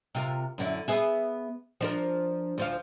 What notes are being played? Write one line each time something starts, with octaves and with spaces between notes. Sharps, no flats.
C3 F4 A#4
F#2 D3 E4
B3 G#4 E5
F3 D4 A#4
D2 F3 F5